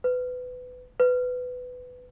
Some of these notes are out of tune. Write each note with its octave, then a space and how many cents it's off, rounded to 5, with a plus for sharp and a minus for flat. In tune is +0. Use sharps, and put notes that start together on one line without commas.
B4 +20
B4 +15